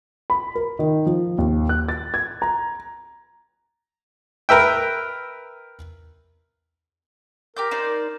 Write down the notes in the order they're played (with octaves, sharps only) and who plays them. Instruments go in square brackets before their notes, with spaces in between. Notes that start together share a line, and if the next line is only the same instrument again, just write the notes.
[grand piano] B5
A#4
D#3
F3
D#2
F#6
A6
G#6
A#5
[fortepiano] A#4 B4 E5 G5
[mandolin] G4 D6 G6 [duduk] A#4
[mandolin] D#4 C5 D5